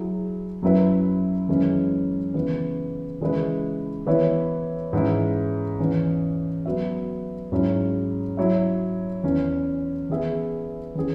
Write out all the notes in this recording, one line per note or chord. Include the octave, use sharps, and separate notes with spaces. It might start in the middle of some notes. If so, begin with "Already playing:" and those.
Already playing: F#3 E4 G#4
F#2 F#3 E4 B4 E5
F#2 E3 G#3 C#4 E4
C#3 E3 B3
C#3 E3 G#3 E4 B4
E3 B3 E4 C#5 E5
G#2 E3 C#4 E4
E2 E3 C#4
F#3 B3 F#4 E5
G#2 F#3 C#4 E4 C#5
F#3 E4 C#5 E5
E2 E3 C#4
E3 B3 G#4 E5
E3 C#4 G#4